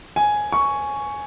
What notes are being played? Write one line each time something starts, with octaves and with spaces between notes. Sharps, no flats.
G#5
C#6